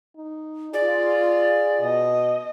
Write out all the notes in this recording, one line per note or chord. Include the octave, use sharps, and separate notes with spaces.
D#4
F4 G#4 D5
B2 D#5